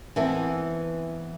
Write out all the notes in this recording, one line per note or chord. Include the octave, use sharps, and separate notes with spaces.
E3 B3 C4 E4 A4